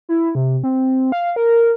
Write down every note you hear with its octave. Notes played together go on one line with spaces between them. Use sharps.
E4
C3
C4
F5
A#4